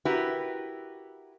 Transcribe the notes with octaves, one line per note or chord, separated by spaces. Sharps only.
E4 F#4 G4 A#4 B4